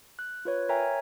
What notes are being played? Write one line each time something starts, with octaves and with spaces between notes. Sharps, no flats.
F#6
F4 B4 C#5
A#4 C#5 E5 G5 G#5 A#5